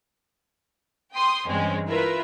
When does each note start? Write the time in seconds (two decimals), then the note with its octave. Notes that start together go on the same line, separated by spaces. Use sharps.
1.14 G5 C6 D#6
1.46 G2 E3 G#3 C4 C#4
1.88 E4 F4 A#4 B4 E5